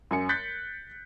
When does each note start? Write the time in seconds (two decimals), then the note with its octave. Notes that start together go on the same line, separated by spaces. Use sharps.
0.11 F#2 G#5 C#7
0.29 F#6 G6 A6 B6 C#7